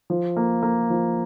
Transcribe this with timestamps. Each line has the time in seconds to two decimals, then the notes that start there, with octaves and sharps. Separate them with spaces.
0.10 F3
0.36 A#3
0.63 A#3
0.90 F3